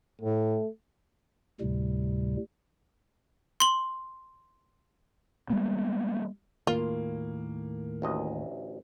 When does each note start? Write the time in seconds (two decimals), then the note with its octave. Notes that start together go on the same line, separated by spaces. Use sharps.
0.21 A2 A3
1.61 D2 A2 C3 G3
3.60 C6 F#7
5.50 G3 G#3 A#3 B3
6.67 D#2 A2 A#3 F4 F5
8.02 A1 D2 D#5